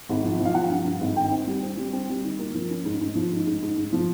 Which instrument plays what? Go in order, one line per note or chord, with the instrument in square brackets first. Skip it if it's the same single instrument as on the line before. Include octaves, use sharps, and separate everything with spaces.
[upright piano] G#1
F3
F3
F5
F3 F#5
G2
G2
G#1
D#3 G5
C4
G3
C4
G3
C4
G3
D#3
A#3
F3
C#4
G#2
G#2
F3
G#2
G#2
G#2
G#2
F3